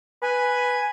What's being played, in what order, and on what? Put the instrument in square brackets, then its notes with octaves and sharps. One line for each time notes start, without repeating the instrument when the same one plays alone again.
[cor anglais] B4 [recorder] G#5